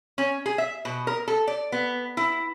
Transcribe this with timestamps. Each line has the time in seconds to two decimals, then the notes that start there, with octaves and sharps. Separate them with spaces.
0.18 C#4
0.46 G#4
0.58 E5
0.85 B2
1.07 A#4
1.28 A4
1.47 D5
1.72 B3
2.17 E4